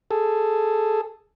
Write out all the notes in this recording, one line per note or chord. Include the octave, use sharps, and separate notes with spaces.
G#4 A4